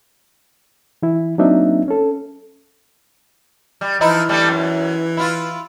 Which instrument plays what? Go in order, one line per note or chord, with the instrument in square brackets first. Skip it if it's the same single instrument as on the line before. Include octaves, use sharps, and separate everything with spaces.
[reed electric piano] E3 E4
F#3 A#3 C4 D4 D#4 E5
C#4 A4
[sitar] G3
[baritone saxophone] E3 [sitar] F3 D#4 E4
[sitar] G3 A3 D4
F#2
E4 F4